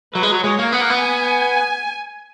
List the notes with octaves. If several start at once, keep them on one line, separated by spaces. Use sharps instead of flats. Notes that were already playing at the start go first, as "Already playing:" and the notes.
F#3 B4
G#3
F#3
G#3 C#5
A#3
B3 F#5
A#3
B3
G#5